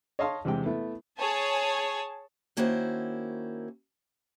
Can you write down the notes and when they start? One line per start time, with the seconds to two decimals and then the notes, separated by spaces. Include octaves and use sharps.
0.19 C#5 D#5 F5 A5 C6
0.45 E2 C3 G#3 G5
0.65 A3 B3 E4
1.18 G#4 C#5 G#5 A5
2.57 D#3 A#3 C#4 E4 F#4 C5